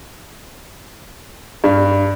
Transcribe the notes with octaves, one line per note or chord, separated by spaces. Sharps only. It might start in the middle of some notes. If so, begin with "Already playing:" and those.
G2